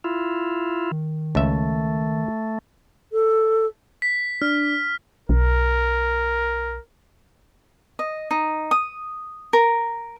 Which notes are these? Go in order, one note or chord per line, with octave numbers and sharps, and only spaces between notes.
E4 F4
D#3
C#2 A3 E5
A4
B6
D4 F6
B1 A#4
D#5
D#4
D#6
A#4